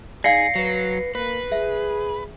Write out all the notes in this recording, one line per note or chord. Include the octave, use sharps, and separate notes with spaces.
D#4 G#4 D5 F5 A#6 C7 C#7
F#3 B4
A#3 B4
G#4 E5